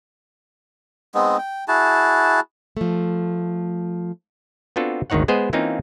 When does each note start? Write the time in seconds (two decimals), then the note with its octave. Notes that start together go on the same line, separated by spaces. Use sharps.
1.15 G#3 B3 C4 D#4
1.38 G5
1.68 E4 F#4 G#4 A5
2.77 F3 A3
4.76 B3 C4 D4 F4 F#4 A4
5.10 G#1 D2 D#3 D#4 C#5 F#5
5.28 G#3 B3 G#4 C5 D#5
5.53 E3 A#3 C4 C#4 D#4 F4